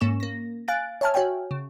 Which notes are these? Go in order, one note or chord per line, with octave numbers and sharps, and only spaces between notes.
G#2 A#3 C#4 C#6 E7
A#3 A#6
F5 G#5 F#6 A6 D7
C#5 E5 G#5 A5 F6
F#4 C#5 E5 G5 G#5
C#3